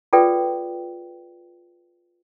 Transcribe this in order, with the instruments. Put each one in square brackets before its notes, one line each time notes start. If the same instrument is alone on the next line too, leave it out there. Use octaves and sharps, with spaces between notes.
[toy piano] F4 G#4 A4 B4 D5 G5